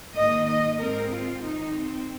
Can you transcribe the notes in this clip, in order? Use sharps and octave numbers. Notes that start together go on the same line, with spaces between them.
G#2 D#3 A#3 D#5
D#5
G#2 G#3 C4 A#4
F4
F2 D#3 C4 D#4
C4